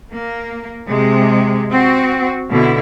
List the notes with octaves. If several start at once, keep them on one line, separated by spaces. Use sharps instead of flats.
A#3
C3 G#3
C4 F#4
B2 D3 E4